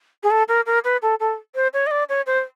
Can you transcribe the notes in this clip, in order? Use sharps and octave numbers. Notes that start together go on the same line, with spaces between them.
G#4
A4
A#4
A#4
B4
A4
A4
C5
C#5
D#5
D5
C#5
C5